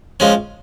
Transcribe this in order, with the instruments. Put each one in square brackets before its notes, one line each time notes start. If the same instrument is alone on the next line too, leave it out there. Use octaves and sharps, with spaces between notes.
[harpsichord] F3 G#3 C#4